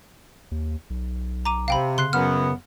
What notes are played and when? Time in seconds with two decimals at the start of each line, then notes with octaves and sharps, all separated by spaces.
0.51 D#2
0.90 B1
1.45 A#5 D6 D#7
1.68 C3 F5 G5 B5
1.98 C#3 C6 F#6 C7
2.13 F#2 C#3 B3 F6